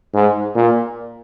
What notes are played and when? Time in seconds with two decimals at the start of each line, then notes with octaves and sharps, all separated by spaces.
0.14 G#2
0.55 A#2